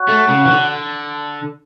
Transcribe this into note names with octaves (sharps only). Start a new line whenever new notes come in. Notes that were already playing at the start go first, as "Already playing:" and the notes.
Already playing: F#4 C#5 F#5
A3
C#3
E3
D3